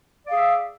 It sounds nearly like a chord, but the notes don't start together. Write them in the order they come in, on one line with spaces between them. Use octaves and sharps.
D5 F5 G#4 E5